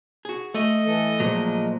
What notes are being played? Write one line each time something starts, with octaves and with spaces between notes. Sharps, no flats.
F#4 G#4
A3 D#5
E3 A4
A#2 F3 F#3 G#3